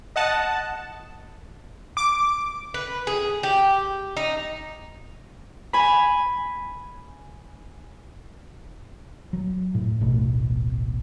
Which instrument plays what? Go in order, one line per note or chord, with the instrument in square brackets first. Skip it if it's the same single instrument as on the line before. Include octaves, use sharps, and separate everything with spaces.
[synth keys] D#5 F#5 A5
[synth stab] D6
[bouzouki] B4
G#4
G4
D#4
[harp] G#5 B5
[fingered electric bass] F#3
A2
D1 A1 B2 A3